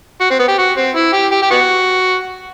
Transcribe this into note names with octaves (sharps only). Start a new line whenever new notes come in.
F#4
C4
B3
G4
F#4
C4
E4
G4
G4
G4
B3 F#4